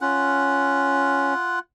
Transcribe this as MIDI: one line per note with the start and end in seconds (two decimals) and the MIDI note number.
0.01 1.34 61
0.01 1.59 65
0.01 1.59 78